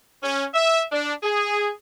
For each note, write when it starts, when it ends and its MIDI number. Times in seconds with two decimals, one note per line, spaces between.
0.23 0.45 61
0.54 0.82 76
0.92 1.13 62
1.23 1.69 68